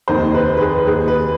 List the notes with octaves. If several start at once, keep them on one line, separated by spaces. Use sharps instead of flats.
F1 D#2 D#3 C5
B4
B4
G#4
D#2 D#3 G#4
B4